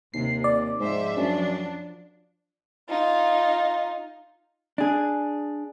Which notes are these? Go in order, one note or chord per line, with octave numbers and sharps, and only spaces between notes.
D#2 C3 C7
D5
G#2 F3 C5 E5
F#2 F3 D4
D#4 F4
D4 G#4